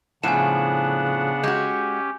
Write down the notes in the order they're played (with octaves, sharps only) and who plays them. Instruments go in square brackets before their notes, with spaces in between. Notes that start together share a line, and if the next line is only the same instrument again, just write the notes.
[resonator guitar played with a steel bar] A2 F3 [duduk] C#3 [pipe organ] B3 D4 F#5 [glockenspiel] G#5 E7
[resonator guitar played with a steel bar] G#3 F#4 [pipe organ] C#4 G4 [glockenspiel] G6